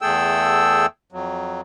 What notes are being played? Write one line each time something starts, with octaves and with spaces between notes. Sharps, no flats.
E2 A3 G#4 A4 G5 E6
F2 F#3